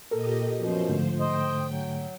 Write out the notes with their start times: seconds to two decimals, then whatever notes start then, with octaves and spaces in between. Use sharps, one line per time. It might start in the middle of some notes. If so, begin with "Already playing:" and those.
0.11 A#2 G4 A4 A#4 D#5
0.58 F#2 B2 F3 C5
0.88 G#2 D3 A3
1.20 C5 D#5 G5
1.68 F#3